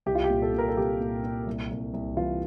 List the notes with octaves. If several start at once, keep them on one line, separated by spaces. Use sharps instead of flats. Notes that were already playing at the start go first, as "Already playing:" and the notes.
C2 G4
F4
G4
A#2
A4
A#2 A#4
A4
C2 G4
A#2
A#2
C2
C2
C2
E3 F4